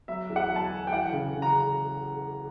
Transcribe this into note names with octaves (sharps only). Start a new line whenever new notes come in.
F#3 E5
E2
F#5
F#3
A5
G#5
F#3
G5
E3 F#5
C#3
C#3
A#5